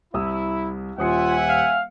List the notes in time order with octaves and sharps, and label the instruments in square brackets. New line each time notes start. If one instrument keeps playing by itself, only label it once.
[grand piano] C2 D#6 E6 [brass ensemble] E4
[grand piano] D#1 D#6 C#7 [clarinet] F4 [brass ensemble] E5 F#5 G#5
[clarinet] F5